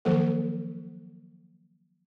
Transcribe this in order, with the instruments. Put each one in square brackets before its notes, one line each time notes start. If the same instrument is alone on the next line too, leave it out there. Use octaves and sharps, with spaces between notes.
[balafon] D#3 F3 F#3 A#3 A4